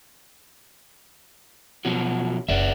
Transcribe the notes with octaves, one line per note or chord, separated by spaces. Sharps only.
B2 F3 F#3
F#1 B4 D5 E5